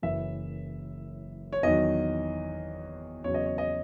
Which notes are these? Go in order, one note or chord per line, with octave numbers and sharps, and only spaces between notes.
F#1 F#2 E3 E5
C#5
E2 D#3 F#3 D#5
E2 C#3 F#3 C#5
D#5
C#5
D#5